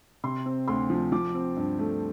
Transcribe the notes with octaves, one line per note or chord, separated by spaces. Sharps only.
C3 C6
C4
D2 C6
F3
F3 D6
C4
G2
A3